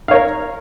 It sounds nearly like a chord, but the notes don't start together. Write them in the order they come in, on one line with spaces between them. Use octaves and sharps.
F5 C#5 A#4